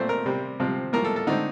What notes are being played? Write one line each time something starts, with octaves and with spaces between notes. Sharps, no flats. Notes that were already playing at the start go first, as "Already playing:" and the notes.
Already playing: A#2 A3 C4 C5
A#4
C3 G3 C4
C3 F3 C4
A2 F3 A#3 A#4
A4
A4
D3 A3 C4 D#4